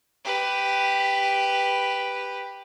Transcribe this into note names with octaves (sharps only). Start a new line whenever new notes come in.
G4 B4